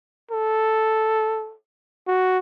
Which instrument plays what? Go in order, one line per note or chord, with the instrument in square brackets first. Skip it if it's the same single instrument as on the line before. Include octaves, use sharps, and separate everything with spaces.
[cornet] A4
F#4